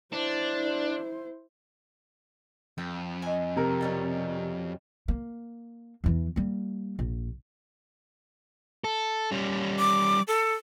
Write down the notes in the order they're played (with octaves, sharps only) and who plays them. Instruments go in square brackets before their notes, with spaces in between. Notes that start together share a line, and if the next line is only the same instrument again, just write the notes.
[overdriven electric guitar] D4 [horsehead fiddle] E4 C5
[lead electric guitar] F2 [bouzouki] G5
[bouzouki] D#5 G#5
[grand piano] C3 A#4
[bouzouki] B2 G3 C#4
[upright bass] A#3
E2 E3
G3 A#3
A#1
[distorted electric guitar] A4
G3 C#4
[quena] D6
A4